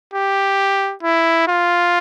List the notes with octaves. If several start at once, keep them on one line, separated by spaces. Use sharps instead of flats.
G4
E4
F4